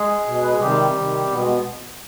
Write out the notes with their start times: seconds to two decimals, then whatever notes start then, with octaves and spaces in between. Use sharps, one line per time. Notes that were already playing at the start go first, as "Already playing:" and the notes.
Already playing: G#3 G#4
0.26 B2
0.42 B4
0.51 G#4
0.60 C3 D#3 G3 G4
0.95 C3 D#3
1.30 B2 B3
1.39 G#3
1.48 B3